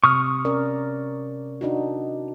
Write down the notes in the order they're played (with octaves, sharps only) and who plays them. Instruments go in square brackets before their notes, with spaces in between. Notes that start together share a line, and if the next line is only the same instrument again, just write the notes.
[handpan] C3 [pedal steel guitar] C#6 D#6 F6
[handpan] C#4 A#4 D5
D4 D#4 F#4